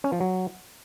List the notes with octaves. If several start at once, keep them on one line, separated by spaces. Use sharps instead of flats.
C#4
F3
F#3